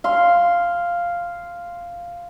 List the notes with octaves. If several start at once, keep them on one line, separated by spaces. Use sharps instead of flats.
F5 C6